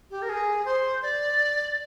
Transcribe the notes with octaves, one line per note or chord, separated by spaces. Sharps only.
G4
A#4
G#4
C5
D5